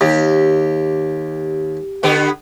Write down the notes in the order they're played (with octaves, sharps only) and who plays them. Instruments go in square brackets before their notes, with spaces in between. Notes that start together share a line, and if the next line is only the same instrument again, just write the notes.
[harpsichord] D#2 [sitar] G4
[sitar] D3 B3 G4